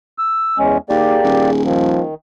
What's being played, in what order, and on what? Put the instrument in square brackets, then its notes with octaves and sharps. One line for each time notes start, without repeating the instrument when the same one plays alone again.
[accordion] E6
E2 G#3 C#4
[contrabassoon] D#2 [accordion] A#3 G4 D5 [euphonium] G#4
[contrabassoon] D#1
[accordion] D#3 [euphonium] F3